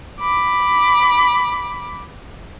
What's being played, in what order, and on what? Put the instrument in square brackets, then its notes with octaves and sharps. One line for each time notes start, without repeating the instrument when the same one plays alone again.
[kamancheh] B5 D6